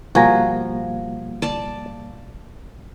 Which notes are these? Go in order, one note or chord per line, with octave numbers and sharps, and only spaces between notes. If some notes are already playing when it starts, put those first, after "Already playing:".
B2 F3 G3 A#3 F#4 G#5 A#5
D5 A5 D6